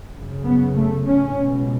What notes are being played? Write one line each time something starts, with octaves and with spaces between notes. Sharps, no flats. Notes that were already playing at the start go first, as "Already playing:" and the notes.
F#2 C#3
B3
A3
C#4
C#2 B2